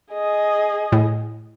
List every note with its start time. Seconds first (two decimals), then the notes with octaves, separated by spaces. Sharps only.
0.13 G#4 D#5
0.92 A2